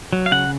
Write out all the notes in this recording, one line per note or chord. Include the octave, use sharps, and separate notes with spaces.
F#3
F5
C#3 F#5